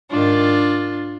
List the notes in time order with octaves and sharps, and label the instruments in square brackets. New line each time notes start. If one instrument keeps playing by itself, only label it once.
[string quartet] G#2 D#3 D4 F4